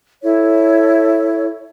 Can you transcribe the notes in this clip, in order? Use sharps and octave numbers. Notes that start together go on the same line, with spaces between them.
E4 A4 C#5